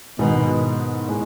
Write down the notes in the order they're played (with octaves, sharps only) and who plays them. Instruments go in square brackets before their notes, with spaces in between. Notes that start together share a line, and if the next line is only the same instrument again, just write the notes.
[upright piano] G#2 D#3 G#3 B3 [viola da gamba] B2
[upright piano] A2 G#3